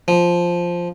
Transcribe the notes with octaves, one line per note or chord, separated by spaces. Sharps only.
F3